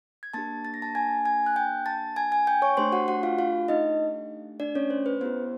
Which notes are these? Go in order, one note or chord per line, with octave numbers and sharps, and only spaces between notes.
G#6
A#3 D4 G4 A5 A6
A6
A#6
A5 A6
G#5 G#6
G#5 G#6
F#6
G5 G6
A5 A6
G#5 G#6
G#5 G#6
G5 G6
C#5 C#6
A3 D4 G4 C5 C6
F#4 F#5
F#4 F#5
F4 F5
F4 F5
D#4 D#5
D4 D5
C#4 C#5
C5
B4
B3 E4 G4 C5